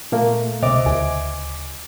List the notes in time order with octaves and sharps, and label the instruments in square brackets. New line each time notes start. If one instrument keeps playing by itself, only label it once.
[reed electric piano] A#2 A3 A#3
[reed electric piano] C#2 D6 [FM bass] B2 [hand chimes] C5 D#5 E5
[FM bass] D2 [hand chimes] G#5